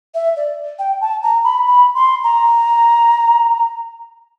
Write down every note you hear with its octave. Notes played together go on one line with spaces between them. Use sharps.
E5
D5
G5
A5
A#5
B5
B5
C6
A#5